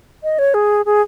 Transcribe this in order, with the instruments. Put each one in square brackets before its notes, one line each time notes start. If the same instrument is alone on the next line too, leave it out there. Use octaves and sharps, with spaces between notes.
[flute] D#5
C#5
G#4
G#4